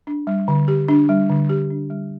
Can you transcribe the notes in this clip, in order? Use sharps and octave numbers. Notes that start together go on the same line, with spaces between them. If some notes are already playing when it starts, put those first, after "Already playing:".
D4
G3
D3
G4
D4
G3
D3
G4
D4
G3